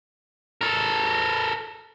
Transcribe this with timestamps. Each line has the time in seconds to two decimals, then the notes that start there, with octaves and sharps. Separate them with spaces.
0.61 A4 A#4